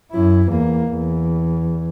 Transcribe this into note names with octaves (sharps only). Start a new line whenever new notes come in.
F#2 E4
E2 A#3
E2